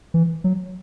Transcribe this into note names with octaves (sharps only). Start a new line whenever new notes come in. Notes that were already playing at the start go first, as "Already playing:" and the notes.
E3
F#3